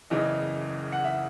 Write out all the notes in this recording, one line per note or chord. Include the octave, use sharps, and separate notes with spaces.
F#1 E2 C#3 E3 D#5
F#5
E5